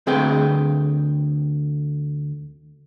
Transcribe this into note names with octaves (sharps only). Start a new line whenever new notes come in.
D2 C4 G#4 B4 G5